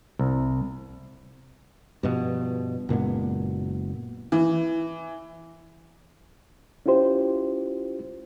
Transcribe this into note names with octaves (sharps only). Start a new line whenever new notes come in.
C2
G2 B2 F3
F#1 A#2 G#3 B3
E3
C#4 E4 F4 G4 C5